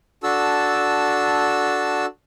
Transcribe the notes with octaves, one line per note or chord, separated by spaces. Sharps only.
D4 F#4 A4 A5 E6